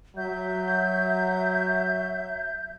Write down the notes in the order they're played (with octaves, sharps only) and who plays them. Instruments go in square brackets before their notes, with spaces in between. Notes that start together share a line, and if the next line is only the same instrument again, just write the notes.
[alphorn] F#3 [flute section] E5 G6